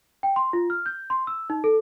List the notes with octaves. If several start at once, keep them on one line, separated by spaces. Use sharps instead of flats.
G5
C6
F4
F6
G6
C6
E6
D#4
A4